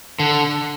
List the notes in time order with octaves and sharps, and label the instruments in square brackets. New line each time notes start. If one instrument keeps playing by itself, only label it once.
[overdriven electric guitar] D3